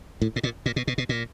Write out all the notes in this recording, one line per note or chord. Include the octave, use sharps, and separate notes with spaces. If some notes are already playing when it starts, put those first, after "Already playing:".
A2
A2
A#2
A#2
B2
B2
B2
A#2